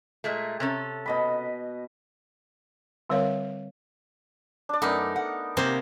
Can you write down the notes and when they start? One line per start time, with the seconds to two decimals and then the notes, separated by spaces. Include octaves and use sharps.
0.24 A#2 G#3 A3
0.60 C3 C#4 A4
1.06 B2 D#5 B5
3.09 D3 G3 C4 A#4 C#5 F5
4.69 D4 D5
4.82 F#2 A3 B3 D#4 A#4
5.16 F#5
5.57 C3 A#3 G4 C5